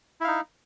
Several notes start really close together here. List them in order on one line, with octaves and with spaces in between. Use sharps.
E4 F5 D#4